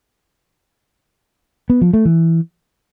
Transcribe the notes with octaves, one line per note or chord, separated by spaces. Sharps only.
B3
F3
A3
E3